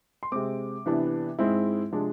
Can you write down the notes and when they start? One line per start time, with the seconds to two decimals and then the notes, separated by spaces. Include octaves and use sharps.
0.23 C6
0.32 C3 G#3 C4 D6
0.86 C3 E3 B3 D4
1.39 G#2 G#3 C4 E4
1.91 C3 F3 G#3 D4